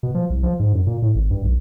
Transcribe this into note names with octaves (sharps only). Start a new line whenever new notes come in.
B2
F3
C2
F3
G#2
F#2
A#2
A2
G#1
G2
B1